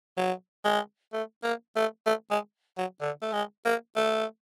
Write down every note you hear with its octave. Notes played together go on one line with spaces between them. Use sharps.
F#3
G#3
A3
A#3
A3
A3
G#3
F#3
D3
A3
G#3
A#3
A3